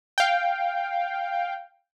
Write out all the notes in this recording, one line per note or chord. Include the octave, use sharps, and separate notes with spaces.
F5 G5